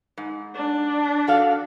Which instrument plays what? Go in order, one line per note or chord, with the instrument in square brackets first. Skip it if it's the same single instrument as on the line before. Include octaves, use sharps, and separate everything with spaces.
[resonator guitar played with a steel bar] G#2
[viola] D4
[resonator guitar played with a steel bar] F#4 A4 F5